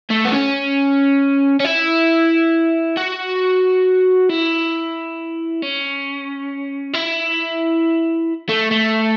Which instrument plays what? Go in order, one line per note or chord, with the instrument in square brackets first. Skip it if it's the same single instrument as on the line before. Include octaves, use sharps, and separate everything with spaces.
[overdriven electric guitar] A3
B3
C#4
C#4
E4
F#4
E4
C#4
E4
A3
A3